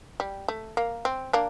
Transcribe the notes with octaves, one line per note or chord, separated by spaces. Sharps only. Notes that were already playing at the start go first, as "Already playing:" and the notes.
G3
A3
A#3
C4
A#3 D4